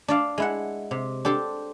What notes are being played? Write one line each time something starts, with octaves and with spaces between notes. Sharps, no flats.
D4 D5 F5
G#3 E4 F#5
C3
D4 G4 A4 C5